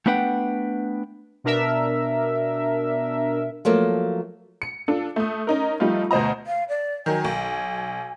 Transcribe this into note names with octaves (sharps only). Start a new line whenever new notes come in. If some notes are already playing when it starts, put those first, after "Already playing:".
A3 B3 D4 B4 F#5 G5
B2 D4 A#4 E5
F3 F#3 A3 A#3
C#7
D4 F4 A4
A3 D#6
C#4 D#4 A#4
F3 G3 A3 D#4 F4
D2 B2 C5 D#5 A#5
F5
D5
D#3 F#3 G#5
B1